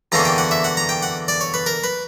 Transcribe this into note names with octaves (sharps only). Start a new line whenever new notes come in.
E2 D3 A#3 C#4 A#5
G5
F#5
E5
F#5
A#5
G5
F#5
D5
C#5
B4
A#4
B4